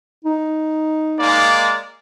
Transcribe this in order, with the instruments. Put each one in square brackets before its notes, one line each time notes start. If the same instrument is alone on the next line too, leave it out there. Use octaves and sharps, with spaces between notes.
[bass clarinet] D#4
[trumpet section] G#3 A#3 D5